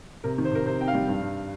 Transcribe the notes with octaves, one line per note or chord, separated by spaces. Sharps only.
C3 A#4
D#3
C5
C3 A#4
C3 C5
C4 G5
F5
G3
G2
G2